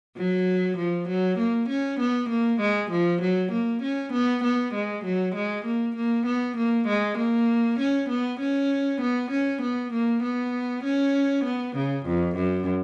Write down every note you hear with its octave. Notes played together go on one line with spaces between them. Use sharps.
F#3
F3
F#3
A#3
C#4
B3
A#3
G#3
F3
F#3
A#3
C#4
B3
B3
G#3
F#3
G#3
A#3
A#3
B3
A#3
G#3
A#3
C#4
B3
C#4
B3
C#4
B3
A#3
B3
C#4
B3
C#3
F2
F#2